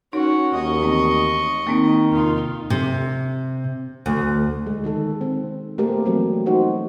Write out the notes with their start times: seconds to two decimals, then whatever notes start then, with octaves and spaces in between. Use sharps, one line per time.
0.13 C#4 D#4 F#4 A#4 C#5
0.54 D#2 D#5 C#6
0.82 E3 A3 C4
1.67 D#3 A#3 C4 D#4
2.11 E2 C3 D#4 F4
2.70 C3
4.06 D2
4.66 G#3
4.84 D#3 G#3 A4
5.21 C4
5.78 A3 A#3 G4 A#4 C5
6.05 E3 F#3 G3 A3 C4
6.46 B3 D#4 F#4 C5